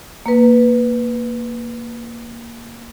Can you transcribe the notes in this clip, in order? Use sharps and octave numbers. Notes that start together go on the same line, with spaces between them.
A#3 B4